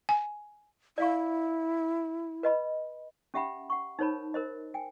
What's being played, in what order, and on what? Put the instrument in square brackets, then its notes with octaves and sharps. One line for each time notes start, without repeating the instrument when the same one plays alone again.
[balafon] G#5
[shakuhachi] E4 [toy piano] D5 F5 C#6
[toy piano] B4 D#5 B5
C#4 G4 E5 F#5 G5 B5
F#5 C#6
D#4 A#4 C5 C#5 A5 B5
A#4 C5 D#5
G5 G#5